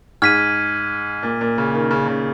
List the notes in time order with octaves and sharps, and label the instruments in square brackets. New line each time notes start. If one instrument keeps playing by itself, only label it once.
[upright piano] G#2 [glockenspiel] F6 G#6 B6 D#7
[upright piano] A#2
A#2
C#3
D#3
C#3
C#3